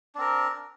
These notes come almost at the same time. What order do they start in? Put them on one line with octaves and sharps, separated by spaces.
D4 C4 A#4